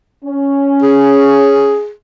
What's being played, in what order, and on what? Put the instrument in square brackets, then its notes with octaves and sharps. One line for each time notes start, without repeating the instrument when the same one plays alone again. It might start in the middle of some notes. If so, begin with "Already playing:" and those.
[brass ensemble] C#4
[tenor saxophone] G#4